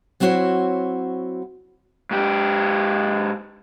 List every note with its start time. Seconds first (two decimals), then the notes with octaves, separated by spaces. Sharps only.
0.20 F#3 C4 E4 F#4 C5 C#5
2.11 G#2 G4